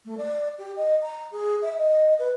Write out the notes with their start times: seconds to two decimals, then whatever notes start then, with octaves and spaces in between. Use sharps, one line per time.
0.05 A3
0.18 D5
0.59 G4
0.76 D#5
1.02 A#5
1.32 G#4
1.62 E5
1.78 D#5
2.19 B4